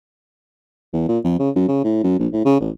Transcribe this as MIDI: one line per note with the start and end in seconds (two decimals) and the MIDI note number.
0.93 1.06 40
1.08 1.18 46
1.24 1.36 41
1.39 1.50 49
1.56 1.67 42
1.68 1.82 49
1.84 2.00 45
2.04 2.17 42
2.19 2.28 34
2.33 2.45 45
2.45 2.57 49
2.60 2.70 33